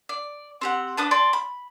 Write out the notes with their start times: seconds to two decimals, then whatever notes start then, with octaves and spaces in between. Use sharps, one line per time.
0.09 D5
0.61 C4 G4 F#5
0.97 D4 B4 D6 D#6
1.11 D5 G5 A5 C6
1.33 B5